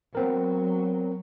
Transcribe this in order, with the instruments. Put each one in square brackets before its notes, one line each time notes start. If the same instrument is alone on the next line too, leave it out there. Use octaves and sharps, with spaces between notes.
[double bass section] F#3 [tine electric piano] B3 C4 A#4